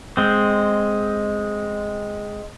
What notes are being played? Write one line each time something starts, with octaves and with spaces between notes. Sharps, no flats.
G#3 C4